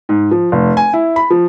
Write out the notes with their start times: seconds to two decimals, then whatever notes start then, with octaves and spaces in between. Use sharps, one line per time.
0.09 G#2
0.31 F3
0.52 F1
0.77 G#5
0.93 E4
1.16 B5
1.30 F3